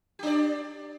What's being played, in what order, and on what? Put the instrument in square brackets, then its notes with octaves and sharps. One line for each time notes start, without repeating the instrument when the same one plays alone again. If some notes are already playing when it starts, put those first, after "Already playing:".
[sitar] G4
D4
D5